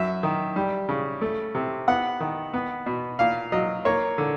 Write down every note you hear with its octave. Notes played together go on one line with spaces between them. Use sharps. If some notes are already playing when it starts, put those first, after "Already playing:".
Already playing: F#2 E5
D#3
G3
C#3
A3
C3
B3 F#5
D#3
B3
B2
A#2 F5
F#3 D#5
A#3 C#5
D3